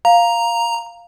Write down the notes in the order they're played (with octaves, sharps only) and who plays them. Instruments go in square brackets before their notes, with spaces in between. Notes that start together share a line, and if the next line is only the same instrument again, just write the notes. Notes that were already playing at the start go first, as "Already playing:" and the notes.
[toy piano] F5 [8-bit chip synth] A#5